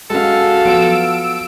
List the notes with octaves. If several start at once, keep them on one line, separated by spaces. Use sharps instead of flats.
G#3 C#4 F#4 A4 F5
F3 F#3 B3 E6 D7